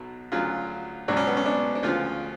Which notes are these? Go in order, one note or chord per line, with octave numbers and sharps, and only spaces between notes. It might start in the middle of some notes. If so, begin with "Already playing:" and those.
Already playing: B1 B2 F#3
D2 C#3 F#3 F4
C#2 B2 F#3 D4
C#4
B3
C#4
D4
D4
D2 C#3 F3 F4